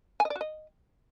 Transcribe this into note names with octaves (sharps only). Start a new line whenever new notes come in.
G#5
D#5
D5
F#4
D#5